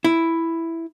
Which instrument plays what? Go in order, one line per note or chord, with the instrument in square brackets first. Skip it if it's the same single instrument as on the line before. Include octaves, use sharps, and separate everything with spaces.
[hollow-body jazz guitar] E4